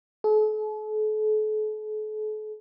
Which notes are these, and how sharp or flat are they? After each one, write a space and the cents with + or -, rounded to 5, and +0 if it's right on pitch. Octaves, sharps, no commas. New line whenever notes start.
A4 -45